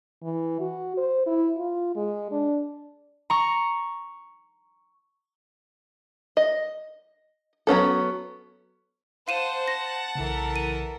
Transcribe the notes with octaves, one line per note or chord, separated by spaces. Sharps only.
E3
F#4
C5
E4
F4
G#3
D4
A#5 C#6
D#5
F#3 B3 C#4 A4
C5 F5 F#5 A5 D#7 E7
A#6
B1 C#3 E3 A4 A#4
D#7